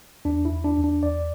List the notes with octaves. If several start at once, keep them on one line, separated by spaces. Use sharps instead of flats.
E2 D4
E4
E2
D4
E2
D4
E2 D5